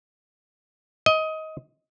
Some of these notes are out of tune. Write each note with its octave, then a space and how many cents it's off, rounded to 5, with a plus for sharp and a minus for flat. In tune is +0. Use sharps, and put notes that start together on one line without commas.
D#5 +20